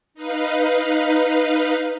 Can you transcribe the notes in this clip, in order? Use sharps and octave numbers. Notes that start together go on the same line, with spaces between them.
D#4 B4 F5